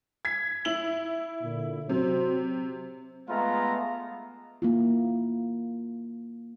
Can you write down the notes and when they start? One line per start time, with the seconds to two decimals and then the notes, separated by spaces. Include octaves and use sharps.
0.25 G#6 B6
0.65 E4 F#7
1.43 A#2 D3
1.89 C3 F#3 C5
3.29 G#3 A3 B3 F4 F5 A#5
4.62 A#3 E4 F4